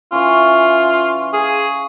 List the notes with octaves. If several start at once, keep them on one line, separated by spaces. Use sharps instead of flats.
E3 C#4 F4
G#4 F5